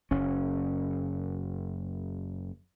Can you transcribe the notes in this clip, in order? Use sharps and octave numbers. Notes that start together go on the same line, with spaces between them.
F#1 C#4